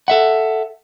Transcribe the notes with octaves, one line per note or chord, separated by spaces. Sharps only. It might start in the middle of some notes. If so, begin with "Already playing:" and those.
A4 E5 F#5